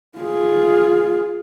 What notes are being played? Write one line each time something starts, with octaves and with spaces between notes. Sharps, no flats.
F4 G#4